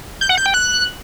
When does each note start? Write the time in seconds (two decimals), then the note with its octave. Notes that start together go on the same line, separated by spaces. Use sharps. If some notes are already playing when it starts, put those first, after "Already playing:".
0.21 G6
0.29 F#5
0.38 G6
0.46 G5
0.54 F#6